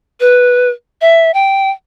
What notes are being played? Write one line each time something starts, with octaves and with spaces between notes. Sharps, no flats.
B4
E5
G5